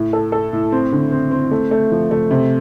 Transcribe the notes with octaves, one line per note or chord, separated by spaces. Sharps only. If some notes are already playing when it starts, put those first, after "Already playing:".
Already playing: A2
A4
A4
A2
C4
D3
C4
C4
A3
A3
F3
A3
C3